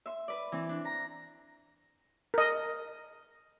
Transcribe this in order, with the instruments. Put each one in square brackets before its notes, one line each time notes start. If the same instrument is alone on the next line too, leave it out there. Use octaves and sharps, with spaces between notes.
[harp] E5 C6
B4 D5
E3 C4
D4
A#5
[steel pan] A#4 D#5